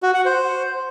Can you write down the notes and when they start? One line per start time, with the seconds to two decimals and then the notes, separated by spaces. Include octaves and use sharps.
0.03 F#4
0.14 F#5
0.25 C5